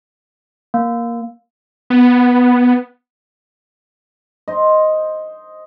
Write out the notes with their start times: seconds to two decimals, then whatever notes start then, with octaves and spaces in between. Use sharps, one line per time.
0.74 A#3
1.90 B3
4.48 C5 D#5